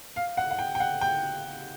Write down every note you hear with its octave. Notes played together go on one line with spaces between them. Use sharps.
F5
F#5
F#5
G5
G5
F#5
G5